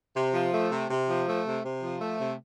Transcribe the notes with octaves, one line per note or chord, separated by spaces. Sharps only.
C3
F3
A3
C3
C3
F3
A3
C3
C3
F3
A3
C3